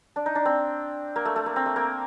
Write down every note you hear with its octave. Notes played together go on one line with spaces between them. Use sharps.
D4
D#4
D4
C4
A#3
A3
A3
A#3
C4
A3
A#3